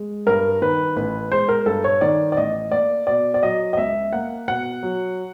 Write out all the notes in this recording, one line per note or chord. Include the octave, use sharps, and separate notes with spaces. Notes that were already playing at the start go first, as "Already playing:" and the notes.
Already playing: G#3
G2 A#4
D#3 B4
A1 B4
G#3 C5
A#4
G2 A4
C#5
D#3 D5
D5
A1 D#5
A#3 D5
B2 D5
D5
F#3 D#5
D#5
C#2 E5
A#3 F#5
B2 F#5
F#3